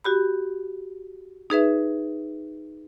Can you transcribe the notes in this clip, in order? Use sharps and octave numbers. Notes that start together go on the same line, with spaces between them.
F#4 G4 B5
D#4 G#4 B4 E5